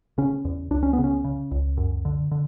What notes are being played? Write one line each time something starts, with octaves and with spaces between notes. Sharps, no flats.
C#3 C#4
E2
C#2 D4
C#4
B3
C#3
C#4
C#3
C#2
F#2
D3
D3